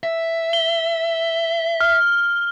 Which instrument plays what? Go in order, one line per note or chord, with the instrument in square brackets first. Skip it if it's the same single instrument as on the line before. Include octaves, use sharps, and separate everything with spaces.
[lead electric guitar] E5
[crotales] G7
F6